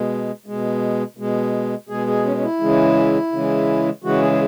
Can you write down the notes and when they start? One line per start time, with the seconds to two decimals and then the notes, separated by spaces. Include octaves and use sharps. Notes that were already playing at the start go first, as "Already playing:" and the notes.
Already playing: B2 G#3
0.46 B2 G#3
1.17 B2 G#3
1.89 B2 G#3 G#4
2.07 G#4
2.25 C#4
2.37 C#4
2.42 E4
2.60 C#3 E3 G#3
3.32 C#3 E3 G#3
4.04 C#3 E3 G#3 F#4
4.22 G#4
4.32 G#4